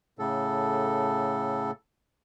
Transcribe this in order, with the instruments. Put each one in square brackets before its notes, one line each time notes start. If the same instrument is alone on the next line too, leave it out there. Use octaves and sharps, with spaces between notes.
[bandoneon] A2 C#3 A4